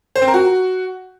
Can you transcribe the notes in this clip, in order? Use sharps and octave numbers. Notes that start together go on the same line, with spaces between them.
C5
C4
A#4
F#4